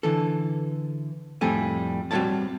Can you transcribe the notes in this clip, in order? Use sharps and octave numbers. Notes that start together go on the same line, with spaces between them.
D3 E3 A4
F2 A2 G3 C4 A4 G#5
G3 C4 F#4 C#5 D5 A5